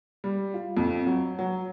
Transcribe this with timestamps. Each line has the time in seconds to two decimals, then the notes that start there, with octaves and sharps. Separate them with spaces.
0.24 G3
0.54 F4
0.77 F2
1.06 F#3
1.39 F#3